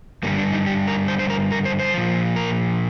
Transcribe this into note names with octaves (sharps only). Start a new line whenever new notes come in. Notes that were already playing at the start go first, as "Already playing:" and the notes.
G2 D3 G3 A#3
D4
D#4
G4
A#4
C5
C5
A#4
A#4
C5
C5
A#2 F3
A#4